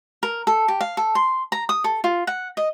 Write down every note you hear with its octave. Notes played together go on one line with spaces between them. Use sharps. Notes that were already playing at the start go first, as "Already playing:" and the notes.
A#4
A4
G4
F5
A4
C6
A#5
D#6
A4
F4
F#5
D#5